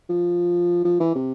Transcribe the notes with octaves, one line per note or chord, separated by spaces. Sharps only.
F3
F3
E3
C3